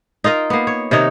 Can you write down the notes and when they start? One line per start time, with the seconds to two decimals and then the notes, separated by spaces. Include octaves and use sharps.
0.24 D#4 F4 A#4 D#5
0.50 A#3 B3
0.67 C#5
0.91 C3 D#3 D#4 C#5